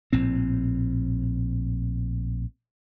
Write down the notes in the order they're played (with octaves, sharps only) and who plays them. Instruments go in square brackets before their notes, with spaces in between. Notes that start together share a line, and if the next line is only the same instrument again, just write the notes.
[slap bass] A#1 A2 C4